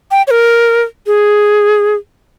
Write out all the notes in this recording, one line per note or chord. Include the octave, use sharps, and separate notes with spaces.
G5
C#5
A#4
G#4